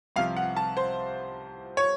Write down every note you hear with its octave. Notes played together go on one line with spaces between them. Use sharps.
C2 C3 F3 F5
F#5
A5
C5
C#5